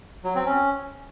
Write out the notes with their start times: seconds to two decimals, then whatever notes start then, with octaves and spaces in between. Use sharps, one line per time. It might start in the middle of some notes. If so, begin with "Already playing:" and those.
0.24 F#3
0.35 C4
0.46 C#4